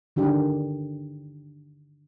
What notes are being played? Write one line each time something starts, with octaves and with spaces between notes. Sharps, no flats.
D3 D#3 D4 G4